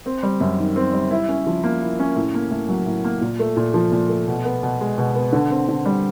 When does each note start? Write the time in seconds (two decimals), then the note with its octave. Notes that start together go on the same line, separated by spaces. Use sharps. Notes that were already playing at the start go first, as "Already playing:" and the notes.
0.06 C4
0.23 G3
0.41 F#2
0.58 D#3
0.76 C4
0.93 G3
1.11 E4
1.29 C#4
1.47 F3
1.64 A#3
1.82 E4
1.99 C#4
2.16 A2
2.34 A#3
2.51 A2
2.69 F#3
2.86 A2
3.04 A#3
3.21 A#2
3.40 A3
3.57 A#2
3.74 F3
3.92 A#2
4.09 A3
4.28 B2
4.45 B3
4.63 B2
4.81 G#3
4.98 B2
5.15 B3
5.33 D3
5.50 C4
5.69 D3
5.86 G3